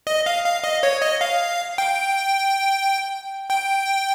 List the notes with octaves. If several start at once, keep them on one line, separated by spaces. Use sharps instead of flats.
D#5
F5
F5
D#5
C#5
D#5
F5
G5
G5